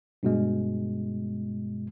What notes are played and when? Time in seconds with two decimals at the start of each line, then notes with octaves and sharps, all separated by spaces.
0.23 G2 B2 G#3